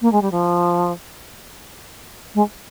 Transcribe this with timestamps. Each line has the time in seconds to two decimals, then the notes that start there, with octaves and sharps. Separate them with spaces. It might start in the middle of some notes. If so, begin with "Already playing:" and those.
0.01 A#3
0.12 G#3
0.21 G3
0.31 F3
2.34 G#3